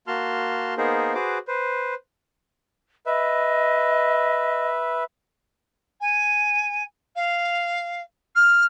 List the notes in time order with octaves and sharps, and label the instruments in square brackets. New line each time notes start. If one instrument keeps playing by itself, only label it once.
[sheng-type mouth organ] A#3 F#4 A5 C6 F6
A#3 B3 D#4 G#4 A#4 C5
F#4 G#4 B4 C5 D6
B4 C5
[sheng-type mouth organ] B4 E5 [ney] D#5
[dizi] G#5
F5
F6